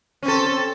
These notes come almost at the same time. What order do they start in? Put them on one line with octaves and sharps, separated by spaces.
C#4 C4 A4